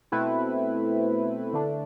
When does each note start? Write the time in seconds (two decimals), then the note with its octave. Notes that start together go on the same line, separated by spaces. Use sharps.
0.12 B2 A3 C4 E4 B4
1.53 D3 A3 D4